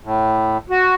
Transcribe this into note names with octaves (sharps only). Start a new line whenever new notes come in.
A2
F#4